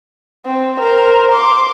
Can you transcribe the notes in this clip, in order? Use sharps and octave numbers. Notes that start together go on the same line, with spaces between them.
C4
A#4 C5
C6 D6